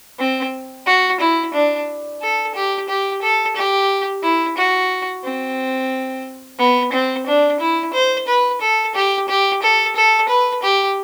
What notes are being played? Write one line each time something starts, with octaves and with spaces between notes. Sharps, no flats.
C4
F#4
E4
D4
A4
G4
G4
A4
G4
E4
F#4
C4
B3
C4
D4
E4
C5
B4
A4
G4
G4
A4
A4
B4
G4